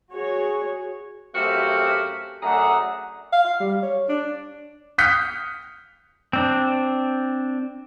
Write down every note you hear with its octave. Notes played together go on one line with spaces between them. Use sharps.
F#4 G#4 C#5
F#2 A3 C4 F#4 G4 F5
F#2 A3 D4 G#4 F#5 A#5
F5
F5
G3
C#5
D4
D#6 F6 G6 B6 C#7
C4 D4